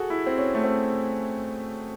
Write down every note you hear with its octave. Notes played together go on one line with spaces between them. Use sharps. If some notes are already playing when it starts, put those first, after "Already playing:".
Already playing: F#4 G#4 A4
E4
C4
C#4
A3
C4